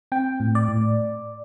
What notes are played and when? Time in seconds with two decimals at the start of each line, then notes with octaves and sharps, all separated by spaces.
0.12 C4 G5
0.40 A2
0.55 D5
0.68 A2